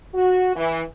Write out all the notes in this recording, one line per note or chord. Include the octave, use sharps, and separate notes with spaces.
F#4
E3